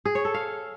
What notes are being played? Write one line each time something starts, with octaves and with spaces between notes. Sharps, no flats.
G#4
C#5
A4
F5